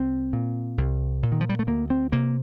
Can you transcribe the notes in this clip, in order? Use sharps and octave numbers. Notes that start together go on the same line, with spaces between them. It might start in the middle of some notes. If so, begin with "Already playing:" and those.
Already playing: C2 C4
A#2
C2
A#2
D#3
F3
G3
A3
D2 A#3
C4
C3 A#3